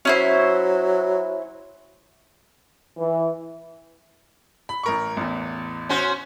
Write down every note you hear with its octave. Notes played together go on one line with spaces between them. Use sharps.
F#3 C#4 E4 C5
E3
B5
A1 A#4 C#6
A1 E2
C#4 F#4 C5